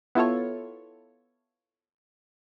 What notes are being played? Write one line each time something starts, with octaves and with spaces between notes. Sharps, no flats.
B3 E4 F4 A4 C#5